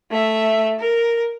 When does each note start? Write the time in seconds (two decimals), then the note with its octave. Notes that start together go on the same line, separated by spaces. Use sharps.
0.11 A3 E5
0.79 A#4